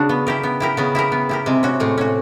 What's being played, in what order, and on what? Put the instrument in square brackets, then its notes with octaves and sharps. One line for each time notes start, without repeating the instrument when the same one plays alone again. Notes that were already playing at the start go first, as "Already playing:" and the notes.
Already playing: [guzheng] C#3 [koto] D4 F#4
[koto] B3
E4 G4 A#4
B3
E4 G4 A#4
[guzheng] C#3 [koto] B3
[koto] E4 G4 A#4
B3
E4 G4 A#4
[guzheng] C3 [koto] G#3
[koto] C#4 F#4
[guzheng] A2 [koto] G#3
[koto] C#4 F#4